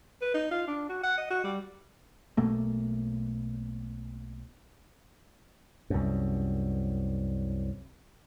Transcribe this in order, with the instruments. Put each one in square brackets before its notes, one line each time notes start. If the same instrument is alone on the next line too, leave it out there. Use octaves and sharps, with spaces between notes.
[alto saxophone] B4
D#4
F4
D4
F#4
F#5
D#5
F#4
G3
[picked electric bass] B1 B2 A3 A#3
[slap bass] C2 F#2